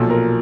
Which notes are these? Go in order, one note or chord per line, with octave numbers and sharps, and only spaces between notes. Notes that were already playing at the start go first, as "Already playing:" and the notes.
Already playing: B1 A#2 F3 A4
A#4